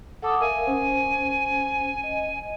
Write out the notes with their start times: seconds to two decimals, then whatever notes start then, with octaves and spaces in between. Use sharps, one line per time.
0.22 A4 F#5 D6 D#6
0.41 A#4 E5 F5 G#5
0.66 C#4 C5
2.04 D#5